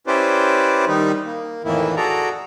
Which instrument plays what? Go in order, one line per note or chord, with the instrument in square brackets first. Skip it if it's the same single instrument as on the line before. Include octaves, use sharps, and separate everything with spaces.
[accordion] C#4 E4 G4 B4 C5 D5
D#3 G3 D#4
A#3
F2 A2 D#3 E3 A#3 E4
F#4 G#4 A4 D5 A#5